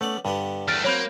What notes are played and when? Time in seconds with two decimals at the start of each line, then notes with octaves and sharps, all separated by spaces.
0.01 A3 B3 C#4 D5
0.25 G2 D3 B3 G4
0.68 E2 A3 F6 A6 D7
0.84 F#3 A#3 C4 C#5 B5 G6